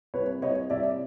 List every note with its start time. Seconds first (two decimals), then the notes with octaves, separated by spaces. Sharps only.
0.14 C2 B4 C#5
0.42 C2 C#5 D#5
0.70 C2 D5 E5